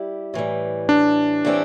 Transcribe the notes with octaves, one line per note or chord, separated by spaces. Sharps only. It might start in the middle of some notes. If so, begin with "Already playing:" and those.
Already playing: G3 E4 G4
A2 E3 G3
D4
A2 E3 G3 C4 G4